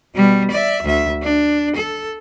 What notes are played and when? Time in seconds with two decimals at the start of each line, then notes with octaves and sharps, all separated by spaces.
0.15 B2 G3
0.51 D5 E5
0.83 D2 E5
1.22 D4
1.76 A4